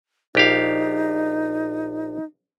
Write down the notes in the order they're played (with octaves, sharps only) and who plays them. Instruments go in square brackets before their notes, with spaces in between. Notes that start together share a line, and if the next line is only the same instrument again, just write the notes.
[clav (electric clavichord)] A#1 G4 F5 [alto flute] D#4